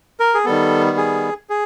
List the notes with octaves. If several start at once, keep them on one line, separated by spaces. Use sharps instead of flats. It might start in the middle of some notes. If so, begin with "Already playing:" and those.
A#4
G#4
D#3 G3 B3 A4
G#4
G#4